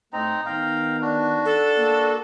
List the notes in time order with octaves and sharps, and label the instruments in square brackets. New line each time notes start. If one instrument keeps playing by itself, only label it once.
[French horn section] A2 A3 [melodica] C4 D#4 A#5
[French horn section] D#3 B3 D#4 [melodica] F5 G5 A#5
[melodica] D4 F#4
[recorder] A4
[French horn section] A#3